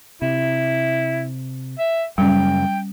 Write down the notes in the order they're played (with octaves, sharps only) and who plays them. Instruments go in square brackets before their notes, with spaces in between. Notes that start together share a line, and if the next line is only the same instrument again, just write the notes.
[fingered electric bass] C3 [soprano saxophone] E4
[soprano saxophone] E5
[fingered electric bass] F#2 C#3 [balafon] G3 C#4 [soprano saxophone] G5